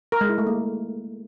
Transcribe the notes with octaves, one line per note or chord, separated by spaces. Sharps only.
A#4
G#3
E4
A3
A#3